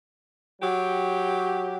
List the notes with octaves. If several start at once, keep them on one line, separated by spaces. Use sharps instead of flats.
F#3 G4